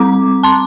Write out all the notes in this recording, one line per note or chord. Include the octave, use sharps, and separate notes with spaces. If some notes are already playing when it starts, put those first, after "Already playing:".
Already playing: G3 C4 A#5 D6
A5 C6